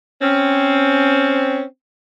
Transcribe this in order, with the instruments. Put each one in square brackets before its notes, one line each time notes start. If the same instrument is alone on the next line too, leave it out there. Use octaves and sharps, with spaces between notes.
[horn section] C4 C#4